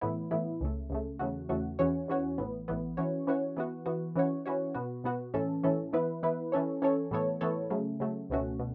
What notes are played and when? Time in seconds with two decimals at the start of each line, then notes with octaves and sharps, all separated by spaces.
0.01 A2 E3 B3 E4
0.31 A2 E3 B3 E4
0.61 C#2 C#3 A3
0.90 C#2 C#3 A3
1.19 E2 C#3 A3 F#4
1.49 E2 C#3 A3 F#4
1.79 E2 E3 C#4 F#4 C#5
2.08 E2 E3 C#4 F#4 C#5
2.38 A1 A2 E3 B3
2.68 A1 A2 E3 B3
2.97 E3 C#4 F#4 C#5
3.27 E3 C#4 F#4 C#5
3.56 E3 B3 F#4
3.86 E3 B3 F#4
4.16 E3 C#4 F#4 C#5
4.46 E3 C#4 F#4 C#5
4.74 B2 B3 F#4
5.04 B2 B3 F#4
5.34 A2 E3 C#4 A4
5.63 A2 E3 C#4 A4
5.93 E3 B3 E4 B4
6.23 E3 B3 E4 B4
6.52 E3 C#4 A4 C#5
6.82 E3 C#4 A4 C#5
7.11 A2 E3 B3 A4 C#5
7.41 A2 E3 B3 A4 C#5
7.70 C#3 F#3 A3
8.00 C#3 F#3 A3
8.30 C#2 B2 A3 C#4 F#4
8.59 B2